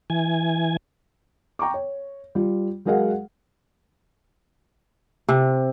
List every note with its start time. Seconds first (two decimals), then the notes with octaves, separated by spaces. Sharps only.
0.10 E3 G#5
1.59 G5 A#5 C#6 D6
1.74 C#5
2.35 G3 F4
2.85 F#3 G#3 G#4 A#4 F5 F#5
5.29 C3